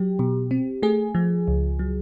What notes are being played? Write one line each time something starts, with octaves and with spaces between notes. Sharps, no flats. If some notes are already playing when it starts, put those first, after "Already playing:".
Already playing: F#3 G4
B2
C4
A3 G#4
F3
C#2
F#3